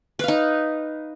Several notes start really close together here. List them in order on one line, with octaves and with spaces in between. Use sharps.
B4 F5 D#4